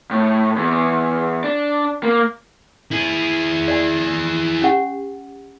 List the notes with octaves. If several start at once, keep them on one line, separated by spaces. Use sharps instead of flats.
A2
E2
D4
A#3
E4 G#4
D5 G#5
C#4 G4 F#5